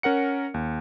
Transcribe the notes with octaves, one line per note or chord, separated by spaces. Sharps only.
C#4 A#4 F#5 C#7
D#2